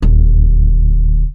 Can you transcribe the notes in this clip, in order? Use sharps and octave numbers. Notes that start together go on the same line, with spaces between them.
D#1 D2